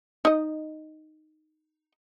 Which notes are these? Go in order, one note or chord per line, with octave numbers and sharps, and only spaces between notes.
D#4 D#5